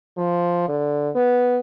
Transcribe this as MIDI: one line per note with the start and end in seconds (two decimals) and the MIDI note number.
0.17 0.65 53
0.68 1.09 50
1.16 1.60 59